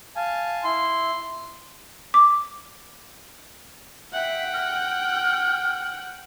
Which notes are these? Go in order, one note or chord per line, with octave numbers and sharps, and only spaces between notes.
F5 G#5 A5
E4 C6
D6
E5 F#5 G5
F6